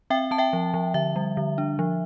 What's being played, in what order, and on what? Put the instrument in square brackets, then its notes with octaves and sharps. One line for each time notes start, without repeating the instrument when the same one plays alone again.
[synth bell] C4 E5 G5
C4 A5
E5 G5
F3
F3
D3 E5
G3
D3
D4
F3